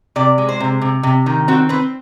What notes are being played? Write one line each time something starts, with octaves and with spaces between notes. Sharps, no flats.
C3 D5
G#3
C5
C3
C3
C3
D#3
C4 F#4
C4 B4